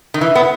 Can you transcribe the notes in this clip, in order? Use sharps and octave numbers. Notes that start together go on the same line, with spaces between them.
D#3
E3
B3